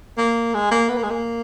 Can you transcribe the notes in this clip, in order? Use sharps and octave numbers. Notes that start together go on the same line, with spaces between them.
A#3
G#3
A#3
B3
A#3
G#3
A#3